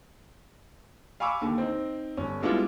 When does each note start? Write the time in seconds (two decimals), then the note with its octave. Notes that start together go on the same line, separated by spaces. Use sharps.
1.20 F5 G#5 B5 C#6 D6 E6
1.41 D#2 D3
1.58 C4 D#4
2.17 G1 C#4
2.42 G3 G#3 B3 D4 E4 F4